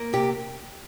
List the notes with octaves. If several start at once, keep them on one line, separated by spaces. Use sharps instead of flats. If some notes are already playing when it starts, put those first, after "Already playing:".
Already playing: A#3
C3 G4